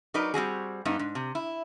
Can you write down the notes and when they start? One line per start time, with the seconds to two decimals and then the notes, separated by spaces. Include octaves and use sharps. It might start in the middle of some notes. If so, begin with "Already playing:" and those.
0.14 F#3 D#4 A#4 B4 D5
0.34 G3 C4 F#4 G#4
0.85 G2 B3 D#4
0.99 G#2
1.15 C3
1.35 E4